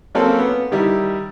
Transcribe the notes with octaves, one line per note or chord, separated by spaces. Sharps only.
F#3 A#3 C4 C#4 A4 F5
B3
D#3 G3 E4